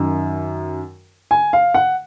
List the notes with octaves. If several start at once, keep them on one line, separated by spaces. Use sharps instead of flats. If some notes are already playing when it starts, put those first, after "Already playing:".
Already playing: F#2 D#3
G#5
F5
F#5